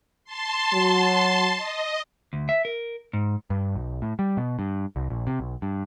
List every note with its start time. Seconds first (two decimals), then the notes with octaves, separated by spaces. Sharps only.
0.24 A5 C6
0.74 F#3
1.56 D#5
2.33 D2
2.49 E5
2.65 A#4
3.13 G#2
3.50 G2
3.75 B1
4.02 A2
4.19 G3
4.37 B2
4.59 G2
4.96 C2
5.10 A#1
5.27 C3
5.39 B1
5.62 G2